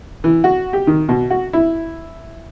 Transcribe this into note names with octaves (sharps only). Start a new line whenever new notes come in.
E3
F#4
G4
D#3
B2
F#4
E4